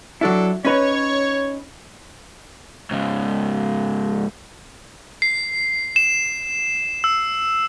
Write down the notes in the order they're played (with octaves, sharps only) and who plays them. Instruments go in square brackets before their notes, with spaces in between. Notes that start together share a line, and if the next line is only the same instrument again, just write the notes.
[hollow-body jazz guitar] F#3 E4 [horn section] D4 A4
[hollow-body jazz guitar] C#4 D#4 B4 [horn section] C#5
[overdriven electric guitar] G#2 C#3
[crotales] C7
E7
E6